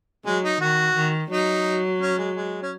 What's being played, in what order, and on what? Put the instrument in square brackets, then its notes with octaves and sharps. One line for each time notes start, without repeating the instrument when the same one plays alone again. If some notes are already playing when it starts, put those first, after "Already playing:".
[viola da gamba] F#3 [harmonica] G#3
[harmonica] D#4
[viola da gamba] D#3 [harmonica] F#4
[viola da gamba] D#3
[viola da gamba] F#3 [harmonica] D#4
[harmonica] C#4
G#3
G#3
C#4